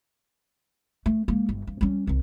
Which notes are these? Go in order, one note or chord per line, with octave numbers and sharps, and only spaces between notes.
A3
G#3 A#3
G1
G2
G3 C#4
C2 D#3